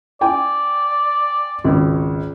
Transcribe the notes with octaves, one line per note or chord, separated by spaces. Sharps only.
D5 G5 G#5
G#1 C#2